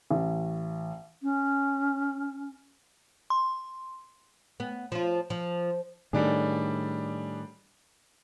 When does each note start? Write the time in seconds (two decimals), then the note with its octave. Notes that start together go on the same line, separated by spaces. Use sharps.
0.11 A1
1.23 C#4
3.30 C6
4.60 B3
4.92 F3 F4
5.30 F3
6.13 A2 D#3 G3 D4 G#4